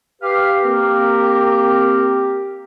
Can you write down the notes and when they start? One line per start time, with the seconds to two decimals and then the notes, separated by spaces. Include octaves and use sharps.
0.22 G4 B4 F5
0.62 A#3 C4 A#4